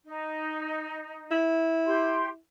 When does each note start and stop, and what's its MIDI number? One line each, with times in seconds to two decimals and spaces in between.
0.05 1.34 63
1.31 2.38 64
1.86 2.27 67
1.86 2.27 84